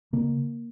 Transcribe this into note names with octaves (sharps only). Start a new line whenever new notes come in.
C#3 A#3